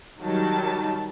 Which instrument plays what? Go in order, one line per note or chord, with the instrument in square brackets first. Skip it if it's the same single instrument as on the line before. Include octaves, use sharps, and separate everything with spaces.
[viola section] D#3 F#3 G3 A5